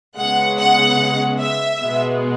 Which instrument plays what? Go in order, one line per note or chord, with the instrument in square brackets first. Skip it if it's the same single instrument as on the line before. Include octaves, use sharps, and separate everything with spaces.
[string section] C#3 G#3 B3 F#5
F#5
E5
B2 G#3 B3